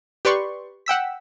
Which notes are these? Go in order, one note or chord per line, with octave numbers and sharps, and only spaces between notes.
G4 B4 D5 C6 C#6
F#5 G5 E6 B6